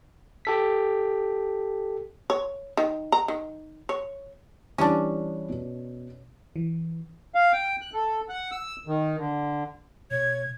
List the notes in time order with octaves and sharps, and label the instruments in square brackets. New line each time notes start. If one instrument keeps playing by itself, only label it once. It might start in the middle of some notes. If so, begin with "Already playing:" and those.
[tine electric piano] G4 A4 B6
[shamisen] C#5
D#3
A#5
D#3
C#5
[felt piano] E3 G3 [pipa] C#4 D4
[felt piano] B2
[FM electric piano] E3
[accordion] F5
G5
F#6
A4
F#5
E6
D#3
D3
[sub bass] B2 [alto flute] C#5 [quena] G#6